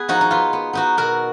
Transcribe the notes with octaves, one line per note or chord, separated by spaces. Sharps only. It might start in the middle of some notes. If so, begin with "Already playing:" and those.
Already playing: B3 G#4 B4
F3 D#4 F#4
D#4
B3 F4
B3
B3 D#4 F#4
B2 F#4 A#4